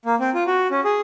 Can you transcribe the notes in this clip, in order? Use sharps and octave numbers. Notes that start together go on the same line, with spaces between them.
A#3
C4
F4
F#4
C#4
G#4